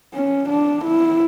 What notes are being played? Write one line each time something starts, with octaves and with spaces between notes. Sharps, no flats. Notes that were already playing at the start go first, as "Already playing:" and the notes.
C#4
D4
E4